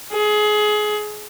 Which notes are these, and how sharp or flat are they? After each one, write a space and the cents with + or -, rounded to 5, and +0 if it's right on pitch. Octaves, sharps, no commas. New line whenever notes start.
G#4 +25